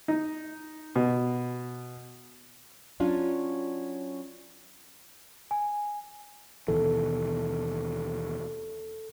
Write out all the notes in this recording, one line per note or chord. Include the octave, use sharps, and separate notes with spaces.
D#4
B2
F#3 C#4 D4 F4 F5
G#5
D#2 B2 E3 A4